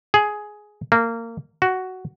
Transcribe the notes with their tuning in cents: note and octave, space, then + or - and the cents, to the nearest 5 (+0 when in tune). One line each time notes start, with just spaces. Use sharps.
G#4 +10
A#3 -25
F#4 +10